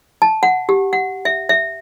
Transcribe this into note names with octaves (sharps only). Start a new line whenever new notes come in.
A5
F#5
G4
F#5
E5
E5